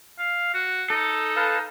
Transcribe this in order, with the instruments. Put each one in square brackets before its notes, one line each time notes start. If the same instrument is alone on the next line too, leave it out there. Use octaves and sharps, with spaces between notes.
[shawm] F5
F#4
[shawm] D#4 [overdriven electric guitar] A4
[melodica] B4 F5 A5